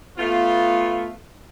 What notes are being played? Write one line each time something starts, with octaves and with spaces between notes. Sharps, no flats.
A3 B3 F4